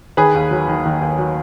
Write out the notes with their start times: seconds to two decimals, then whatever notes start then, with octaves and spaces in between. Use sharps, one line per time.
0.17 D#3 G#4 B4
0.35 D#2
0.51 F#3
0.68 D#3
0.86 D#3
1.02 D#2
1.18 F#3